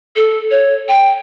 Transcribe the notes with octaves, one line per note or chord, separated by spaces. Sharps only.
A4
C#5
G5